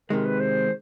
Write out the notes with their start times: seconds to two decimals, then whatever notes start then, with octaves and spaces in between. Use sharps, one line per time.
0.10 C3 D#3 G#3 A#4
0.25 B4
0.40 C5